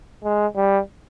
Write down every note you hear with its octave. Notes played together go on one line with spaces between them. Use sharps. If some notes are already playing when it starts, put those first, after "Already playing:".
G#3
G3